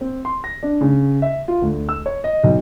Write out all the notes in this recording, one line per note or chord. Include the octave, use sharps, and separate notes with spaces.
C4
C6
A#6
D4
C#3
E5
F4
D2
E6
C#5
D#5
B1